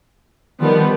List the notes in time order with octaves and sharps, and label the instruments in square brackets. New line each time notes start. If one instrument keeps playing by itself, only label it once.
[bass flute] D#3 [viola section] F3 G3 B3